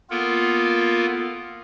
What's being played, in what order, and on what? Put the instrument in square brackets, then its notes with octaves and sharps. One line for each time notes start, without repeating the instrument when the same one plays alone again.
[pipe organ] A#3 B3 F4 A4 A#4